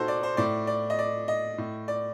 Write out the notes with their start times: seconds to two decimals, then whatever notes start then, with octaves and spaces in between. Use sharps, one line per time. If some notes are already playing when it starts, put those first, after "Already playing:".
Already playing: A#2 D#4 F#4 A4 C5
0.08 D5
0.23 C5
0.37 A2 D5
0.67 D5
0.90 D#5
0.99 D5
1.28 D#5
1.58 A2
1.88 D5